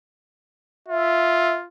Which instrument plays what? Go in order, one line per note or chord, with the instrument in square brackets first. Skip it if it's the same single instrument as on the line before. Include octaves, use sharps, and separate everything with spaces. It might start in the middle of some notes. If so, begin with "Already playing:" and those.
[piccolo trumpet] F4 [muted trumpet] E5